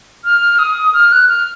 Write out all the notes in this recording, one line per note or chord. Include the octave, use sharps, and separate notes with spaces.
F6
D#6
F6
F#6
F6